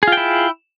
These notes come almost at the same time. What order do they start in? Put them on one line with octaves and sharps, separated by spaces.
G#4 F4 G5 E4